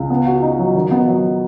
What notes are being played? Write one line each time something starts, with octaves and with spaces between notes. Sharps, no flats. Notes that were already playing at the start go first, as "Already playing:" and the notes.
Already playing: C#2
B3
F#4
D#4
F#3
D#3
B3
F#3